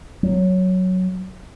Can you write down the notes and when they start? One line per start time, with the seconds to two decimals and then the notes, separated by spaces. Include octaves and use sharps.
0.23 F#3